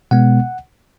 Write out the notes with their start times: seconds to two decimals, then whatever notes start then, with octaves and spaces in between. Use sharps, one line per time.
0.11 B2 G#3 B3 F#5